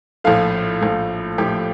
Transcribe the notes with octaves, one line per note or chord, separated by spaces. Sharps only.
A#1 A2 F3 A3 F4 F5
A#1 A2 F3 A3
A#1 A2 F3 A3 G4 G5